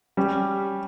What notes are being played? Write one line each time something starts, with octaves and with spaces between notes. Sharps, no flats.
G3 C#4 G4